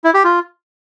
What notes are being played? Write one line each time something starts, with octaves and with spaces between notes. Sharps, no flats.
E4
G4
F4